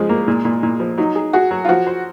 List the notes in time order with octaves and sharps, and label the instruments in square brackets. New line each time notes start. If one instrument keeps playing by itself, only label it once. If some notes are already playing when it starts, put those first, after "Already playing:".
Already playing: [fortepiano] C#3 F3 [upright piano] G#3
[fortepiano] A#3
A#2
A#2
A#2
F3
[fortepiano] F#3 [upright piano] D#4
[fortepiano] G#4
[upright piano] F#4 [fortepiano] G#4
[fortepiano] F#3
[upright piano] F4
[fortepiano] F3 [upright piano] F#4
[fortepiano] C5